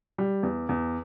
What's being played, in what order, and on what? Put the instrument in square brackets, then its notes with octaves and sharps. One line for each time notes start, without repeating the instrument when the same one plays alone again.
[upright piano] G3
E2
E2